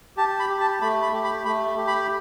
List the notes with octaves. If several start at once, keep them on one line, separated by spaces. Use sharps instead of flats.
G4 A5
B5
G4
A5
A3 B5
B5
G4
B5
A3 B5
G4
B5